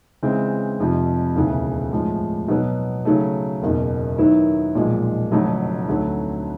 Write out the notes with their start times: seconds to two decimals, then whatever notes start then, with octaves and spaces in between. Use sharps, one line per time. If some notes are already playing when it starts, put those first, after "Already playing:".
0.22 C#3 E3 G#3 C4
0.79 F1 F2 C3 F3
1.35 E1 D2 C#3 E3
1.92 A2 F3 G#3
2.48 B2 F#3 B3
3.05 C#3 F#3 A3
3.62 F#1 E2 B2
4.18 D#3 F#3 B3 E4
4.75 B1 A#2 F3 G#3
5.32 F1 F2 D3 F#3 A3
5.88 D2 D3 F#3 A3